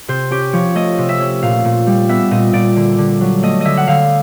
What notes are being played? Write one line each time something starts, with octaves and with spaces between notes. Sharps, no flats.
C3 C5
C#4 G4
F3 C#5
A3 D#5
C3
E5
C#4
A#2 F5
A#2
G3
B3 E5
A#2 D#5
A#2 D5
D3
D3
F#3
A3 D#5
D3 D#5 E5
F#5
D3 F5